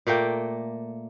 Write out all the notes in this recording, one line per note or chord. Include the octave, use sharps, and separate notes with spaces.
A#2 A3 A#3 G5